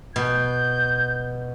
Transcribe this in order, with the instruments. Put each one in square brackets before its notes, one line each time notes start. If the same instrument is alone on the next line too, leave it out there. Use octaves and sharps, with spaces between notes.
[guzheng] B2 [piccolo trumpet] G6